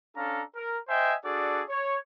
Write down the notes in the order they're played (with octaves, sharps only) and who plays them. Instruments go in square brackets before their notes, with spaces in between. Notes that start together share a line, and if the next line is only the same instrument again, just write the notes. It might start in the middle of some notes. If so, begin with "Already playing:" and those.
[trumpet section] C#4 D4 A4 F5 A#5
A#4
C5 D#5 E5 G5 G#5
D4 F#4 G#4 A4 D5
C#5